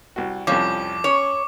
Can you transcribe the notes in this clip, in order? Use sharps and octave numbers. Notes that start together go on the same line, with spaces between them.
C2 F#4
C2 F2 F3 C#4 D6
C#4 C#5